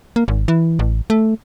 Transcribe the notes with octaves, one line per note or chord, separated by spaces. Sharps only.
A#3
G#1
E3
A1
A3